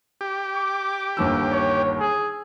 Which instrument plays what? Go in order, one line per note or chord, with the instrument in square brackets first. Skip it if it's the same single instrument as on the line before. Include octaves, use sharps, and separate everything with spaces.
[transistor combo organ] G4
[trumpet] D6
[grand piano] G1 D#2 E6
[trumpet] C#5
G#4